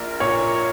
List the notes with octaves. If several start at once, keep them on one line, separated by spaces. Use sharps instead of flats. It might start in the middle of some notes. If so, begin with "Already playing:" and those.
Already playing: A#1 A#2 A#4
A#2 C#5